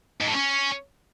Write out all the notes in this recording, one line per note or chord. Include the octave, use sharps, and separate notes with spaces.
G#2
A2
C#4